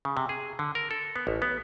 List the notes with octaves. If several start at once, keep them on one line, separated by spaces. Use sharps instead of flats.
C#3
C3
G#4
D3
A#4
A4
B3
A1
B3